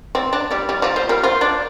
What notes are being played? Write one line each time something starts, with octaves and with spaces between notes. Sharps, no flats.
C4 D5
D4 D5
G3 D5
G3 D5
F3 D5
F3 C5
G3 A#4
F4 C5
D4 D5